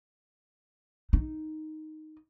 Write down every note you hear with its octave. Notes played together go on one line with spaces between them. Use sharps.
D#4